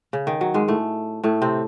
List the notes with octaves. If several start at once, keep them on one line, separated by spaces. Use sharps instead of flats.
C#3
D#3
F#3
G#2 G#3
A2 A3
A2 A3
C3 C4